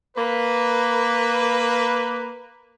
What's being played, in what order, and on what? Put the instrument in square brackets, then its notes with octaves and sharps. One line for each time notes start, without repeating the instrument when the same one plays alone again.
[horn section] A#3 B4